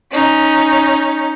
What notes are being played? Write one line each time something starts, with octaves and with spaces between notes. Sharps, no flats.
C#4 D#4